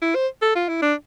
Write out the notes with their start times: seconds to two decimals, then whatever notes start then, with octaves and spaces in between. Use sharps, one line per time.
0.02 E4
0.15 C5
0.42 A4
0.55 F4
0.69 E4
0.82 D4